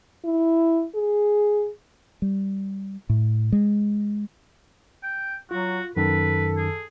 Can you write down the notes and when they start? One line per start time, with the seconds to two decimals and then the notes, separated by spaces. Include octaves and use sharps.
0.25 E4
0.95 G#4
2.22 G3
3.09 A2
3.52 G#3
5.03 G5
5.51 F#3 F4 F#4
5.97 F#2 D#3 A4 B4
6.57 G#4